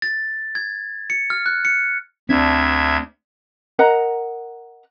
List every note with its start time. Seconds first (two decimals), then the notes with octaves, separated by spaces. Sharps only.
0.02 A6
0.55 G#6
1.10 C#7
1.30 F6
1.46 F#6
1.65 C#7
2.29 D2 C4 D4 E5 G#6
3.79 A#4 D#5 F#5 A#5